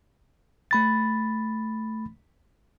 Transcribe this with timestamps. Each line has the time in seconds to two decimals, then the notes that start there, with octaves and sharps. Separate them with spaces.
0.71 A3 B5 A6